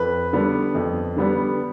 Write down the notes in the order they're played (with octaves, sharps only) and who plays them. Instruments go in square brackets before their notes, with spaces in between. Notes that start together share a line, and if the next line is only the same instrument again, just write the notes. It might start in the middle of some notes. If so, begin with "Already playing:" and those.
Already playing: [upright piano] F2 B4
D3 G3 B3 D4
F2
D3 G3 B3 D4